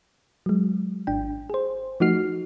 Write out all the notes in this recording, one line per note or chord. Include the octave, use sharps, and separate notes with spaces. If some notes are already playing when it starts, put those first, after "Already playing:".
F#3 G#3
G#1 D4 G5
G#4 C5
F3 A3 D#4 F#4 F6 C7